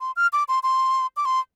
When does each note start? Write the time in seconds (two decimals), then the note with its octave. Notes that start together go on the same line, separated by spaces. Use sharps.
0.01 C6
0.16 F6
0.33 D6
0.48 C6
0.63 C6
1.17 D6
1.25 C6